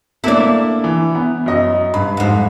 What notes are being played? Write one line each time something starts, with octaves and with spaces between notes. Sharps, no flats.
A3 A#3 D4 E4 D5
E3
B3
F#2 D#5
G2 B5
F2 G#2